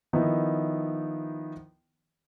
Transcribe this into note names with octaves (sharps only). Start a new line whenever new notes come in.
D#3 F3 B3 D#4 E4